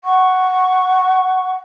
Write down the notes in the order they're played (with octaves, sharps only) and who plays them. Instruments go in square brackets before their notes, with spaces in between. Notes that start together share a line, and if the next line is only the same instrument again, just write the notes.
[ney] F#5 [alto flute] C#6